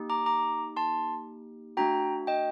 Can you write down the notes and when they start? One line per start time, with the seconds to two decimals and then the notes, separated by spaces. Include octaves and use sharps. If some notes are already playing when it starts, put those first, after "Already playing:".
Already playing: A#3 D#4 G4
0.10 A#5 D6
0.26 A#5 D6
0.76 A5 C6
1.77 A3 D4 F#4 G5 A#5
2.27 D#5 G5